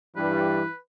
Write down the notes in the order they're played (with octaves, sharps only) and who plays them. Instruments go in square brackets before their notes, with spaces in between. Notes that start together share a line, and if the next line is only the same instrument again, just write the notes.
[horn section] G2 G3 [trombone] E3 [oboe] B4